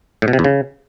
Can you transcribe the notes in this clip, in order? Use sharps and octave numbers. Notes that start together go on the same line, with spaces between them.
A2
B2
C3
E2
C#3